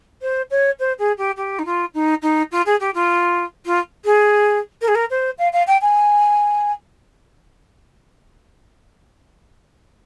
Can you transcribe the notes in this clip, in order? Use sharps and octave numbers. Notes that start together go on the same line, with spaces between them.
C5
C#5
C5
G#4
G4
G4
D#4
F4
D#4
D#4
F4
G#4
G4
F4
F4
G#4
A#4
G#4
A#4
C5
F5
F5
G5
G#5